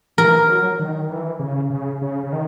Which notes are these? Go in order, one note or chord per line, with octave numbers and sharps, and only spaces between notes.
E3 A#4
F#3
D#3
E3
C#3
C#3
C#3
C#3
D#3